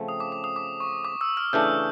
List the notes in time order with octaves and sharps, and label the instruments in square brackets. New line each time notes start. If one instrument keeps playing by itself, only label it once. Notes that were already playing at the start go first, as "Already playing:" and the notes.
Already playing: [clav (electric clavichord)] C#3 F3 A3 C4
[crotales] D#6
D6
D6
D#6
D6
C#6
D6
E6
F6
[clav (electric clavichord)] C#3 E3 A3 D4 [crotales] G6